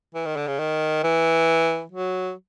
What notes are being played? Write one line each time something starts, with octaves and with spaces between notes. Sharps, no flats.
E3
D#3
D3
C#3
D#3
E3
F#3